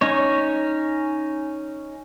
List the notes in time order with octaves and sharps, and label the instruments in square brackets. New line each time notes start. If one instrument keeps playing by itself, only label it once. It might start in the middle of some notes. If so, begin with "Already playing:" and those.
[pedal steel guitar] C#4 D#4 C#5